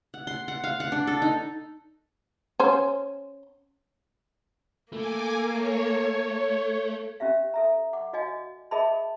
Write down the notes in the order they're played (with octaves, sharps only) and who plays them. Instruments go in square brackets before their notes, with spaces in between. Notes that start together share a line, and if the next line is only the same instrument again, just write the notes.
[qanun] F#5
C6
F#5
F5
F#5
D4
A4
D#4
[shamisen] C#4 C5
[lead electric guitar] A3 [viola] A#3 [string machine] G#5 D6
[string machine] C#5
[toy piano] C#4 G4 E5 F5
A4 E5 A#5
F#5 D6
F#4 D5 D#5 F5 G#5
G#4 A#4 D#5 E5 A5 B5